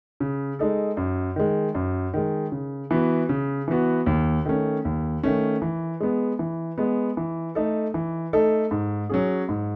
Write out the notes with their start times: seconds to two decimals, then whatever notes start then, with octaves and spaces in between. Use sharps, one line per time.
0.20 C#3
0.59 G#3 D#4 A4
0.97 F#2
1.36 D#3 G#3
1.75 F#2
2.14 D#3 G#3
2.52 C#3
2.91 E3 B3 F#4
3.29 C#3
3.68 E3 B3 F#4
4.06 D#2
4.46 D#3 A3 C#4
4.85 D#2
5.23 D#3 A3 C#4
5.62 E3
6.01 G#3 B3
6.39 E3
6.78 G#3 B3
7.17 E3
7.55 A3 D#4 A4
7.94 E3
8.33 A3 D#4 A4
8.71 G#2
9.09 F#3 C#4 G#4
9.49 G#2